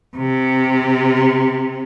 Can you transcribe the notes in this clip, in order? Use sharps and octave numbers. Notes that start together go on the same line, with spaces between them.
C3